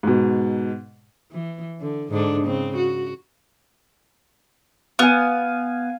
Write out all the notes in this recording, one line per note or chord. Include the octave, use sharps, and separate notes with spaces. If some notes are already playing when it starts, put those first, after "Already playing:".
G#2 B2
E3
D3
G#2 D3 D4
C#3 C4
F#4
B3 F5 G#5